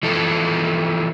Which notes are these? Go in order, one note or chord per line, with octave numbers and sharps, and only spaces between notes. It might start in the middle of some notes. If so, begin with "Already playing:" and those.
E3 F3 A4